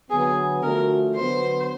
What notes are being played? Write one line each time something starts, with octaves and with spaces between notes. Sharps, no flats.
D3 F#3 B3 G#4
D3 F3 A3 D4 F#4 A#4
D3 F#3 B3 C5